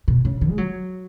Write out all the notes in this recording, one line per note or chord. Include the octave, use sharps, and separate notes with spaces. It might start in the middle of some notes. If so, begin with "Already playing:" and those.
B2
C#3
D3
G#3
F#3